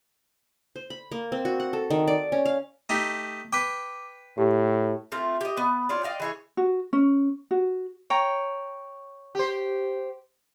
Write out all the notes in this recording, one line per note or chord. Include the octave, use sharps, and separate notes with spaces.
C5
B5
A#3
C4
F#4
F#5
A4
D#3
D5
C#4
F5
A3 D#4 G4
B4 G5 D6
A2 G4
A3 C4 F4
G4 D#5
B3 B4
D4 F4 C#5
D5 D#5 F5 G5
E3 G#4 C#5
F#4
C#4
F#4
C#5 G5 A#5
G4 C5